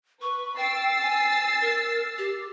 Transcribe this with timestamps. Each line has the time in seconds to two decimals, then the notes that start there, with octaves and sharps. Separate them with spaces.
0.22 B4 C#6
0.57 G5 E6 A6 C7
1.02 G#5
1.62 A#4
2.18 G4